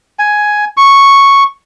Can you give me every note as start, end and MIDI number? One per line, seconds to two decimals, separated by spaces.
0.19 0.65 80
0.77 1.44 85